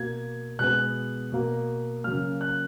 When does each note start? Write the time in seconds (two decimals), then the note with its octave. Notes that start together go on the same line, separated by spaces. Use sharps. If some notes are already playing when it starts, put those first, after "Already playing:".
Already playing: B2 A#3 G#6
0.59 B2 G#3 B3 F#6
1.32 B2 A#3
2.04 C#3 F#3 A#3 F6
2.41 F#6